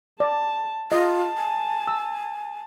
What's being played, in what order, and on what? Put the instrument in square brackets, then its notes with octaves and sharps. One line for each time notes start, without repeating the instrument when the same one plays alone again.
[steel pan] D5 [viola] A5
[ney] F4 [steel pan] D#5 [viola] A5
[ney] G#5
[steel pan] E6